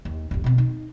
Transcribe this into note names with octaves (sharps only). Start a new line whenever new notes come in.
D#2
A1 F2
B2 C4
D#4